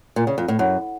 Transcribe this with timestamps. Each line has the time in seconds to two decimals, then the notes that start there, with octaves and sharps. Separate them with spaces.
0.16 A#2
0.27 C#3
0.38 F2
0.48 A2
0.59 F#2